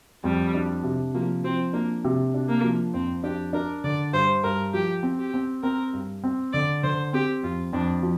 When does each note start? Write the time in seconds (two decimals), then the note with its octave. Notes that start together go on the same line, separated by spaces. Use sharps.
0.24 F2 G3
0.54 D4
0.83 C3
1.14 F3 A#3
1.44 F3 C4
1.73 A#3 D4
2.04 C3
2.34 D4
2.49 A#3
2.64 F3
2.94 F2 C4
3.24 D4 G4
3.53 D4 A#4
3.84 D3 D5
4.13 G2 C5
4.43 G2 A#4
4.73 F3 G4
5.03 C4
5.19 G4
5.34 C4
5.63 C4 A#4
5.93 G2
6.24 C4
6.53 D3 D5
6.83 D3 C5
7.13 C4 G4
7.43 F2 F4
7.73 F2 D4
8.03 F3